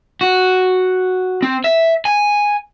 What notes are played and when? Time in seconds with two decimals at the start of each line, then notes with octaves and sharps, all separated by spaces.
0.21 F#4
1.42 C4
1.64 E5
2.05 G#5